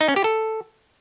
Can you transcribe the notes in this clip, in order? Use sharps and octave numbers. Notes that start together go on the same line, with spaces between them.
D#4
C#4
G4
A4